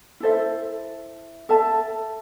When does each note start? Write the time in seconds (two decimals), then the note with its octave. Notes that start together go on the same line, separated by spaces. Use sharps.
0.20 E4 A4 C5 E5
1.49 A4 E5 A5